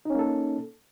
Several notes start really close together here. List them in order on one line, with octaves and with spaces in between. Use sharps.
D#4 C#4 A#3 A4